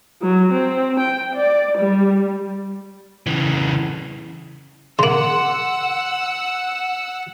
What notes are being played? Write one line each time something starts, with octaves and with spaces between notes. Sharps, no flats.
F#3
C4
G5
D5
G3
C#3 E3
C#3 A#3 F#5 C6 E6 F#7